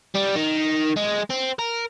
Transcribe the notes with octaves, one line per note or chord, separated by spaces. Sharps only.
G3
D#3
G#3
C4
A#4